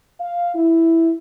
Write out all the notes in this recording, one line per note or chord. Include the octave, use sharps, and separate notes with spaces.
F5
E4